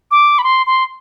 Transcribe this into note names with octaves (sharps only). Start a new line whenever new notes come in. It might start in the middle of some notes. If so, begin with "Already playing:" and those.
D6
B5
C6
C6